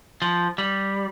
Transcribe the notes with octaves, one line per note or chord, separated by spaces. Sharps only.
F3
G3